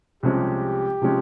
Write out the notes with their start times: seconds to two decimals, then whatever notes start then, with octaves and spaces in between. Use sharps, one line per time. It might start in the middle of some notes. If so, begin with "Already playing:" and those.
0.23 C2 C3 F3 G#3 C#4 G4
1.01 C3 F3 G#3 C#4